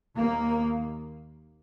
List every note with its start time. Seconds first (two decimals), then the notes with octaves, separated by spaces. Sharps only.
0.19 D#2 A#3